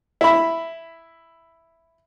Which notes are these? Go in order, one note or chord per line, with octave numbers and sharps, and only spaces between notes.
E4 B5